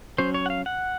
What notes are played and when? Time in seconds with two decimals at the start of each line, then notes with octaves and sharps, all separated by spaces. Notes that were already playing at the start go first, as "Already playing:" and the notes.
0.18 F#3 C#4 C5
0.34 C#5
0.46 F#5
0.50 F5
0.66 F#5